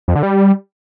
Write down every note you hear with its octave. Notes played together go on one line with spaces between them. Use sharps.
F2
D3
G3